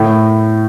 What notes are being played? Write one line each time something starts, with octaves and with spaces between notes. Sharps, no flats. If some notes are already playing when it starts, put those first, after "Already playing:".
Already playing: A2